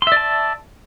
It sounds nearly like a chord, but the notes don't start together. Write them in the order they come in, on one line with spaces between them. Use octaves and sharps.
C6 E5 D5 A5